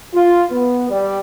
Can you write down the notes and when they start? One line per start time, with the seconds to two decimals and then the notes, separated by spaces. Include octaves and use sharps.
0.14 F4
0.51 B3
0.91 G3